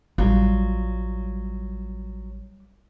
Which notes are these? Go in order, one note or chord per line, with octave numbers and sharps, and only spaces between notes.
A1 F#3 G3 F4